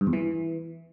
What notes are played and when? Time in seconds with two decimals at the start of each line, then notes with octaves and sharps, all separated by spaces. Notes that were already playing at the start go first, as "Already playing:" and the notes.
0.01 G2
0.07 E2
0.13 E3